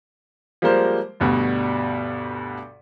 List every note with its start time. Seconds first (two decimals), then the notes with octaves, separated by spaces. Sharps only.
0.62 F3 G3 G#3 A#3 A#4 C5
1.20 D2 G2 B2 G3